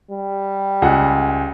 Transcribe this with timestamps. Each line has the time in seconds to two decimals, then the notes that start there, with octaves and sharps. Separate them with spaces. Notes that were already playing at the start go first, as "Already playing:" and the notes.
0.11 G3
0.82 C#2 G#4 F#5